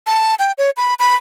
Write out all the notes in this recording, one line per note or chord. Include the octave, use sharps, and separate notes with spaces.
A5
G5
C#5
B5
B5